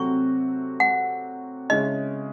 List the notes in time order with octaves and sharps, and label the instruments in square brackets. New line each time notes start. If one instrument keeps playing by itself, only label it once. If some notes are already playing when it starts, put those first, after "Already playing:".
Already playing: [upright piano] C3 F#3 A3 C4 F#4 [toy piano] C#6
[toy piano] F#5
[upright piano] C#3 G#3 C#4 E4 [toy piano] D#5